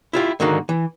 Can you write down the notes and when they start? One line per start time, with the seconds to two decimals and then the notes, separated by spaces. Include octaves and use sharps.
0.13 E4 F4 G4
0.40 G#2 D3 D#3 A#3 F#4
0.69 E3